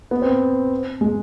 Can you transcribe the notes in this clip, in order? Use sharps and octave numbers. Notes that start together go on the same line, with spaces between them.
B3
C4
G#3